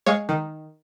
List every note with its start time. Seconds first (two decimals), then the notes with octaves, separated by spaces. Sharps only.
0.06 G#3 C#5 F5
0.29 D#3